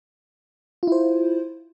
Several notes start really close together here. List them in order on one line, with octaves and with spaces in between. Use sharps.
F4 E4 C5